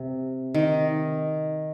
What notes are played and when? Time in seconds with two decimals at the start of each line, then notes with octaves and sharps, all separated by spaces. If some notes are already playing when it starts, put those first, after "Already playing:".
Already playing: C3
0.54 D#3